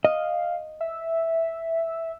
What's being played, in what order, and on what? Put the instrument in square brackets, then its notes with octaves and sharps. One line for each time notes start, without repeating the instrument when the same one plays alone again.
[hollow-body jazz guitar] D#5 [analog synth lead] F5
[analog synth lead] E5